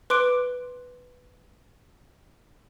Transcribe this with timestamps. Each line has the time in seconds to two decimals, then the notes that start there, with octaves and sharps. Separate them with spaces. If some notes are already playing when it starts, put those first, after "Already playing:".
0.10 B4 C6 D6 F#6 D7